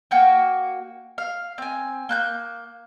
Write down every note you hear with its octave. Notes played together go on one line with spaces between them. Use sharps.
A#3 F#4 G5
F5
C4 G#5
A#3 F#6 G6